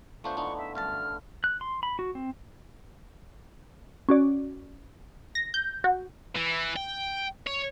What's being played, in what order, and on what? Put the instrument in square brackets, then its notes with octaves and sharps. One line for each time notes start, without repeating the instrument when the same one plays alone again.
[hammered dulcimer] F3 B3 [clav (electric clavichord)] A3 D4 C5 [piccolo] C#6
[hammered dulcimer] D3 E3 A3 [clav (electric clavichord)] D4 D#4
[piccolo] E5
[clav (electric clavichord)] G1 F#2 A5 [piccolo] F6
[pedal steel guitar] F#6
C6
B5
F#4
C4
[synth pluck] C#4 F#4 D5
A#6
G6
F#4
[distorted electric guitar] E3
G5
C#5